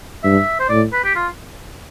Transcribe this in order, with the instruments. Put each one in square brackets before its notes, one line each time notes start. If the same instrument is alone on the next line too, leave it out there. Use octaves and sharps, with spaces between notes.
[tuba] G2 [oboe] E5
[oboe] C5
[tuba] A2 [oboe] D5
[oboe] B4
G4
F4